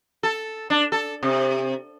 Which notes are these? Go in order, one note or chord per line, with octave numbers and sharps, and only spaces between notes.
A4
D4
A4
C3